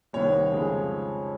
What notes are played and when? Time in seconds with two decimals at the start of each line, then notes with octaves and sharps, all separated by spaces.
0.13 C2 C3 D#3 G3 C#5
0.52 F2 C#3 F3 G#3